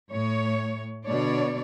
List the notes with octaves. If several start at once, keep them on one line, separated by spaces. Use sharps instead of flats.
A2 C#5
B2 D3 D4 C#5 D5